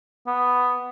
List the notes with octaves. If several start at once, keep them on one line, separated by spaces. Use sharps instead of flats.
B3